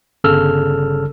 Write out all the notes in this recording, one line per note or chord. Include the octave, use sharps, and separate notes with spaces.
G1 C#3 A4 E6 F6